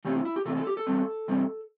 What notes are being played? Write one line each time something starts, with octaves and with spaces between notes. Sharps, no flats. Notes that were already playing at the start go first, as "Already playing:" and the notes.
C3 E3 A3 C4 G4
E4
E4
G4
C3 E3 A3 C4 A4
A4
G4
A4
E2 C3 G3 C4
E2 C3 G3 C4